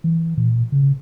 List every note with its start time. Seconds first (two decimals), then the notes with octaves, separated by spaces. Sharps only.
0.04 E3
0.37 A#2
0.72 C#3